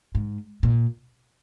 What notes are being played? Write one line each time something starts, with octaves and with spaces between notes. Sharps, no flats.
G#2
A#2